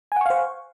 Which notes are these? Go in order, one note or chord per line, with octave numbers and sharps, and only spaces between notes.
C5 F5 F#5 G#5 C#6